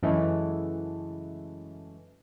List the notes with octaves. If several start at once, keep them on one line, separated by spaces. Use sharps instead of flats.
F#2 C#3 E3 G#3 A3